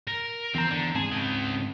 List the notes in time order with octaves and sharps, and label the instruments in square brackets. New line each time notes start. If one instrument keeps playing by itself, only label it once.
[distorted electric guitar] A#4
[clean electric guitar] E2 A#5 [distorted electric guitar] C4
[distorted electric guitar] D3
[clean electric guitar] G#2 C4 A5 [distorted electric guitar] G#4
[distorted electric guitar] C#3 D#5